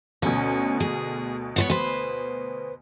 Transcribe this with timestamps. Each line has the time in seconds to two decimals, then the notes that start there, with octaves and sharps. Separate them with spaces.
0.22 D2 B2 C#4
0.80 G#4
1.56 B3 C5 C#5
1.70 B4 C5